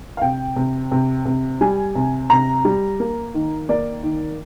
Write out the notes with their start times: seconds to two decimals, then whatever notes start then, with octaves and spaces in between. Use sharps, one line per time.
0.17 F5
0.22 C3 G5
0.56 C3
0.91 C3
1.25 C3
1.61 G3 G#5
1.95 C3
2.30 C3 A#5
2.65 G3
3.00 A#3
3.34 D#3
3.69 A#3 D5
4.03 D#3